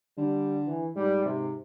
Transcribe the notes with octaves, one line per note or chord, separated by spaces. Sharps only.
D3 G3
E3
G#2 G3
C3